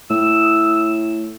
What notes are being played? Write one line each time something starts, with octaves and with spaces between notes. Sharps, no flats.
A2 E6